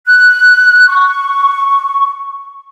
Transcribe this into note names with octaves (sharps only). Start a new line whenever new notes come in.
F#6
C#6